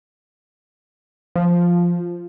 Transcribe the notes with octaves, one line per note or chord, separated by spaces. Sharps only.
F3